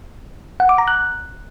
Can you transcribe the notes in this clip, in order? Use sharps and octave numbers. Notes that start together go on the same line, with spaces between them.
F#5
D6
A#5
F#6